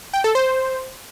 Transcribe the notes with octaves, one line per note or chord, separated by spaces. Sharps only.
G5
A4
C5